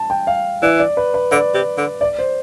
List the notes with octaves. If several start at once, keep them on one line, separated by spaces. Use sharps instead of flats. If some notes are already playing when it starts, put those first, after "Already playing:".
Already playing: A5
G5
F5
E3 D5
D5
B4
B4
D3 D5
C3
D3
D5
C5